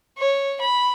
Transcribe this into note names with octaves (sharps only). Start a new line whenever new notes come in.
C#5
B5